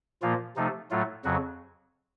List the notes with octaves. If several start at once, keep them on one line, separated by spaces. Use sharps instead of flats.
A#2 F3 A#3 F4
C3 F3 A3 D#4
A2 F#3 A3 F4
F2 C#3 F#3 F#4